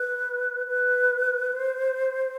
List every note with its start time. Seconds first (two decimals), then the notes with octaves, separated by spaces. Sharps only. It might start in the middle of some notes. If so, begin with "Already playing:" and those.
Already playing: B4
0.67 B4
1.52 C5